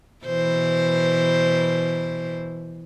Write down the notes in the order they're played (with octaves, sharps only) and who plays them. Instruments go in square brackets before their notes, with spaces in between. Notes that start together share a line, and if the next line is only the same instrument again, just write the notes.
[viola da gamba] B2 E3 C5